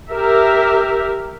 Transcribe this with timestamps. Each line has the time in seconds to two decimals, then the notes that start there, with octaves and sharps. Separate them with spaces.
0.11 G4 A#4 E5